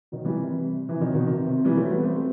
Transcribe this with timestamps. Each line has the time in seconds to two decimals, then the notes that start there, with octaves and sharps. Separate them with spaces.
0.12 D#3 F#3
0.25 E3 G3
0.38 C3
0.89 C3 E3
1.01 D#3 F#3
1.15 B2 D#3
1.27 C3
1.46 C3
1.65 E3 G3
1.77 F#3 A3
1.91 G3 B3
2.03 A3 C4